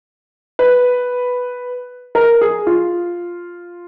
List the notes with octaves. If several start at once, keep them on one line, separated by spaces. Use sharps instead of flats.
B4
A#4
G#4
F4